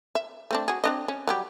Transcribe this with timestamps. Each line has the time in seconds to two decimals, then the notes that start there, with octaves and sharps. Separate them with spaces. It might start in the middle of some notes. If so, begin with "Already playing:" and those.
0.15 E5
0.51 A3 C4 D4
0.68 F#4 G#4
0.84 C4 D4 D#5
1.08 C#4
1.27 F#3 G3 G4